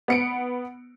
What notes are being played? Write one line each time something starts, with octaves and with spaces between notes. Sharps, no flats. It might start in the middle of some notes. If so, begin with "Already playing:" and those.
B3 C#7 D7